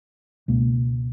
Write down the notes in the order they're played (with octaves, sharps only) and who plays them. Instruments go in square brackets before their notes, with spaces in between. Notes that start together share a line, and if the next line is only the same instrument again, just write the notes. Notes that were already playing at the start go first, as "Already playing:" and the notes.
[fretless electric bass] C#2 B2 A#3